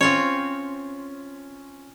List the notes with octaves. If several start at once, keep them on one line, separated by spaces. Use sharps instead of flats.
C4 C#4 F4 C#5